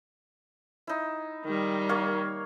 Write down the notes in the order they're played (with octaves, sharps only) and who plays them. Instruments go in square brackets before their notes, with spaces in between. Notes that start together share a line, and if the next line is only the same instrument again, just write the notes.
[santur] D#4 E4
[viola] D#3 G3
[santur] A#3 C#5 F5